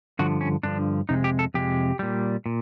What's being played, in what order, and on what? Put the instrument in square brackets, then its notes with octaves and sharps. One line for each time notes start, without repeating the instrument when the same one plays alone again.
[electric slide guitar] G2 D3 F3 F#4
C#4
G2 D3 F3 D4
F2 C3 G#3 D#4
G4
A4
F2 C3 G#3 G4
A#2 G3
A#2